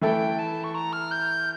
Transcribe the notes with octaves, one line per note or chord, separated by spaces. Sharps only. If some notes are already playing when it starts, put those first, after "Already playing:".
E3 A3 E4 A4 G5
A5
C#6
A#5
F6
G6